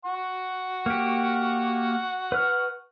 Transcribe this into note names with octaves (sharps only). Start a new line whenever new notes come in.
F#5 C#6
A#3 G4
B4 F6